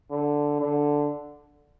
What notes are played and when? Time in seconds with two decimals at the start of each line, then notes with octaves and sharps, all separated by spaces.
0.10 D3
0.61 D3